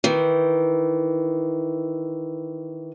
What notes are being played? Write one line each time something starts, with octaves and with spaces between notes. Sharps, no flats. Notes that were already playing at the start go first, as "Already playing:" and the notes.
D#3 E3